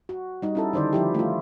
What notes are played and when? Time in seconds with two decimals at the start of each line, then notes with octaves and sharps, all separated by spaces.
0.09 F#4
0.42 G3 D#4
0.55 C#4 E4 A4
0.73 D3 D#3 C5 D5
0.93 F3 E4 G4
1.15 A3 F4